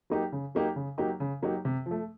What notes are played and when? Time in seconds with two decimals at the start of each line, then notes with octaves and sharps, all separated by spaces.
0.10 F#3 A#3 D#4 G4
0.32 C#3
0.55 F#3 A#3 D#4 G4
0.76 C#3
0.98 F#3 A#3 D#4 G4
1.20 C#3
1.42 F#3 A#3 D#4 G4
1.65 C3
1.86 F3
1.91 A3